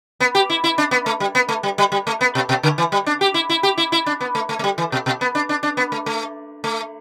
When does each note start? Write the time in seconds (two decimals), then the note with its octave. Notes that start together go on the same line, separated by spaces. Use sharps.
0.20 B3
0.35 G4
0.50 E4
0.64 E4
0.78 D4
0.91 B3
1.06 A3
1.20 G3
1.35 B3
1.49 A3
1.63 G3
1.78 G3
1.92 G3
2.07 A3
2.21 B3
2.35 B2
2.49 B2
2.63 D3
2.78 E3
2.92 G3
3.06 D4
3.21 G4
3.34 E4
3.50 E4
3.63 G4
3.78 E4
3.92 E4
4.06 D4
4.21 B3
4.35 A3
4.49 A3
4.59 A3
4.64 G3
4.78 E3
4.92 B2
5.06 B2
5.21 B3
5.35 D4
5.49 D4
5.63 D4
5.77 B3
5.92 A3
6.06 A3
6.64 A3